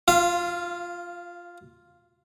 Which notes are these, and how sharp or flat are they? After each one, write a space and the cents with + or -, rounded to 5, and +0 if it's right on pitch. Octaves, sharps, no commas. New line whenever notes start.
F4 +0 F5 -25